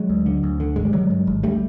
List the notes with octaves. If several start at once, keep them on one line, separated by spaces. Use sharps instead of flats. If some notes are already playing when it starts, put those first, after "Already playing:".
Already playing: F#3 G#3
D2
D3
D2
D3
G#1 G#3
G3
D3 F#3 G#3
G2
G#1
D2 G3 A3